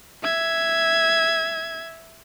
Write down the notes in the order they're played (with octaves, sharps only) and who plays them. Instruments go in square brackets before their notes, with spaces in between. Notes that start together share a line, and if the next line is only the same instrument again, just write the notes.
[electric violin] E5 G#6